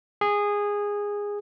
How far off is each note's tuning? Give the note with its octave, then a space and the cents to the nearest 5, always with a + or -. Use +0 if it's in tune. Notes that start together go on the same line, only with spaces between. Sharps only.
G#4 -15